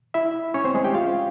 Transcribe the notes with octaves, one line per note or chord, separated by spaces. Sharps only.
E4 E5
C#4 C#5
C4 C5
G#3 G#4
G4 G5
F4 F5